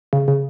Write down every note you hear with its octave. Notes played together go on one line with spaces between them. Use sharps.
C#3
C#3